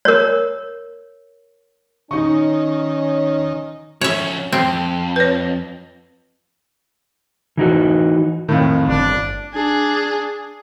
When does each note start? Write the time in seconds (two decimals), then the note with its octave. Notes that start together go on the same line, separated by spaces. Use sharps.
0.05 A#4 C#5
2.11 D#3 C#4 D#4 C#6
4.01 F3 C#4 C#5 E5
4.52 F2 C4
5.16 B4 C#5
7.57 E3 D#4 F#4
8.49 F2 A2 D#3
8.88 G1 D4
9.54 D4 G#4